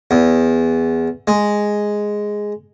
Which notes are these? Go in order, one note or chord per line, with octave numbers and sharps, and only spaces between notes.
E2
G#3